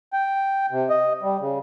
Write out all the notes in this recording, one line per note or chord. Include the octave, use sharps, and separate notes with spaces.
G5
C3
D#5
G3
C#3